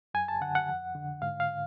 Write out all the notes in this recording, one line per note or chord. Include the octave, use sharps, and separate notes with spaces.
F#2 G#5
A5
D3 F#5
F#5
F2
D3
G#2 F5
F5